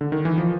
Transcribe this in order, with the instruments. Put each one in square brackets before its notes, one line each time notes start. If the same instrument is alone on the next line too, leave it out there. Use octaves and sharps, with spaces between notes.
[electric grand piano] D3
D#3
E3
F3